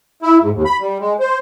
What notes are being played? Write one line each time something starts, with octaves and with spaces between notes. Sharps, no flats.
E4
G#2
D#2
B5
G3
G#3
C5